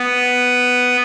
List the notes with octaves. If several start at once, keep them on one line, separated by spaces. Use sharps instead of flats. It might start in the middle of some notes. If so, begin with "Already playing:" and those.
Already playing: B3